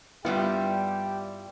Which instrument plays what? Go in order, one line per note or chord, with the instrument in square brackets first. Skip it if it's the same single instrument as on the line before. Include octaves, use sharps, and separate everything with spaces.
[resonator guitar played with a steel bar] G2 G3 E4 [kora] B3 F4 [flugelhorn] G4